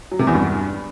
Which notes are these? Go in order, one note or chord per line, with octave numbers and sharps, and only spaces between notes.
F#3
C3
E2
G2